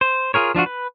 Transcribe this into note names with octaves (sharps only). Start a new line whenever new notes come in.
C5
F4 G#4 A#4 C#5
F3 D4 F4 F#4
B4